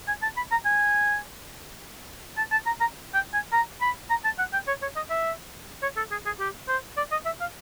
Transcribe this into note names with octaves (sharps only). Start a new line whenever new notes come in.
G#5
A5
B5
A#5
G#5
A5
A5
A#5
A#5
G5
G#5
A#5
B5
A#5
A5
F#5
G5
C#5
C#5
D#5
E5
C#5
A4
G#4
G#4
G4
C5
D5
D#5
E5
F5